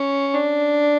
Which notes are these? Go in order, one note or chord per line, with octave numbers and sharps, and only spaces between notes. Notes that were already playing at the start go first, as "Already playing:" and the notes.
Already playing: C#4
D4